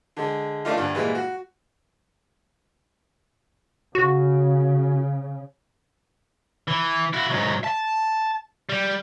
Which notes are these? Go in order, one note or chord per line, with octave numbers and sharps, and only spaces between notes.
D3 G#3
A3 A#3 D4 D#4 F4
D2 G2
A#2 E3 G3 G#3
F#4
C#3 F#4
E3
E4 F#4
G#2 F#3
A5
G3